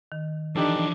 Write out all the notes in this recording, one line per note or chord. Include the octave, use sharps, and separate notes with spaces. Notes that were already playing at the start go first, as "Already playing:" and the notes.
D#3
E3 F3 D4 D#4 G4 A4